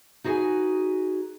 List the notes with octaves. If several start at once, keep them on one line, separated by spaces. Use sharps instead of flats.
D#4 F#4 G#4 B4 G#5